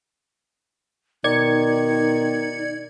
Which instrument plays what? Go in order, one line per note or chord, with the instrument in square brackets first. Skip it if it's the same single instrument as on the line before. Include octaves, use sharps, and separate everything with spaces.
[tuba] B2 [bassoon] D#3 [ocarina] D#4 [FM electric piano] D5 G#6 C#7